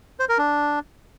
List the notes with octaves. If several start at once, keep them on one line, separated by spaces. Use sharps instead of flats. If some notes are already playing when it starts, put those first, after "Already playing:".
C5
A#4
D4